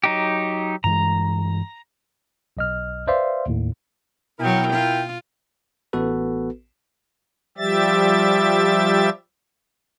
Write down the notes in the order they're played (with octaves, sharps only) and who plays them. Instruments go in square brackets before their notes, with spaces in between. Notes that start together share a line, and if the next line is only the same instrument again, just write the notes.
[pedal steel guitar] F#3 D#4 G4
[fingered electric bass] G2 E3 G#3 [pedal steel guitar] A#5
[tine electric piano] B1 D#5 F6
B4 C5 D5 E5 F5 C6
D#2 A2
[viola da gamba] B2 F#3 [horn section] E4 A#4 G5
[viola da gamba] F4
[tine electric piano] A1 B3 F#4 A4 B4
[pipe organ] F3 G3 G4 E5 A6